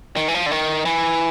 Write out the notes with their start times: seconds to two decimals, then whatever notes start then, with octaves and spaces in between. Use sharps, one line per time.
0.17 D#3
0.28 E3
0.34 F3
0.46 D3
0.51 D#3
0.85 E3